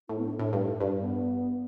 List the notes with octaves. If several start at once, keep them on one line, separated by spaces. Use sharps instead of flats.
A2 E4
B3
D4
A2 D4
G2 D4
E4
D4
G2
B3